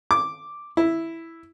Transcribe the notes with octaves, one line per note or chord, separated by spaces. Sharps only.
D6
E4